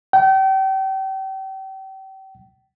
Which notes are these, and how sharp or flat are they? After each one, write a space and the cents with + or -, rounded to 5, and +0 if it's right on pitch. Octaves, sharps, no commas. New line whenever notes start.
G5 -35